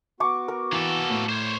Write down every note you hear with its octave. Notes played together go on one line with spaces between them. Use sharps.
B3 F#4 C#6 D6
A#4
E3 A#3 A4
A2
C5 C#5